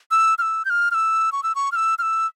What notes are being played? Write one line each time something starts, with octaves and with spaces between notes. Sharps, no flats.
E6
F6
E6
G6
F6
F6
E6
C#6
E6
C#6
F6
E6
F6
E6